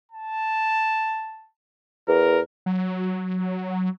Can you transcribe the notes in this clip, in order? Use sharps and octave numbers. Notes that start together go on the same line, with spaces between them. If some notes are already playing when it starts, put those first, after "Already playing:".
A5
E2 A#4
F#3